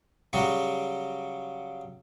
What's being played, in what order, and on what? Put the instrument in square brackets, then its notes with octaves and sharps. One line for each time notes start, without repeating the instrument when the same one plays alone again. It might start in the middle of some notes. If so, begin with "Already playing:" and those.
[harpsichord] C#3 F#3 G3 F#4